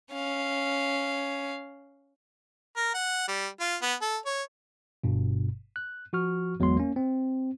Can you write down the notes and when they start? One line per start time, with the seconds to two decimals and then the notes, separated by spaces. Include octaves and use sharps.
0.12 C#4 F5
2.76 A#4
2.94 F#5
3.28 G3
3.60 F4
3.82 B3
4.01 A4
4.26 C#5
5.04 G1 G2 B2
5.76 F#6
6.13 F3 F#4 C#6 F6
6.59 G1 E2 F#3 G#3 B3 C6
6.77 A#3 C#4
6.96 C4